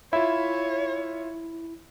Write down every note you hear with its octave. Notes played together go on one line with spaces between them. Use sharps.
E4 F4 C#5 E5